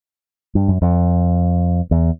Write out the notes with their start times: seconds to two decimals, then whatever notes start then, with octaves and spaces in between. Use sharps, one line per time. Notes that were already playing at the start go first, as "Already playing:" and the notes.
0.55 G2
0.68 F#2
0.82 F2
1.91 E2